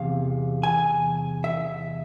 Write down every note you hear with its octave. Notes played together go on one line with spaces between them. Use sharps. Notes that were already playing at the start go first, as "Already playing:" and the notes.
Already playing: E2 C3 F5
G#5
E5